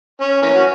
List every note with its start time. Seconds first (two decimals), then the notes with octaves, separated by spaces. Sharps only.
0.21 C#4
0.42 E3 A#3 C#4
0.54 F#4